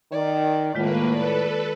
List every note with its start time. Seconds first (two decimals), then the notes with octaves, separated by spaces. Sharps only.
0.12 D#3 D5
0.75 A2 D#3 G#3 A#3 F4 B4
1.13 A4 B4 D5